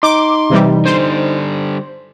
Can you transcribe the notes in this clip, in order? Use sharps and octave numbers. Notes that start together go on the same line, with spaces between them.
D#4 C6 D6
C3 E3 G3
D3 G3 C5